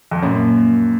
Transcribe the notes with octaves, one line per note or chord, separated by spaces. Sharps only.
F2
F#2 A#2 A#3